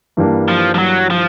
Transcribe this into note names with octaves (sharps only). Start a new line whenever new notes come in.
G2 E3 G3 A#3 D4
F3
F3
F#3
F3